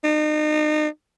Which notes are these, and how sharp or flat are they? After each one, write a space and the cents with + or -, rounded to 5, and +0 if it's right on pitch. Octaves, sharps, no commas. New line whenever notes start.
D#4 -35